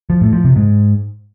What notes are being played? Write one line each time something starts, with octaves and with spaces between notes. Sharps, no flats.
F3
A2
F3
C3
G#2